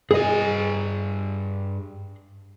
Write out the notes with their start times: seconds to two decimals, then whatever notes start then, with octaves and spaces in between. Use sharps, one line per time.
0.11 G2 G#4 D#5 G#5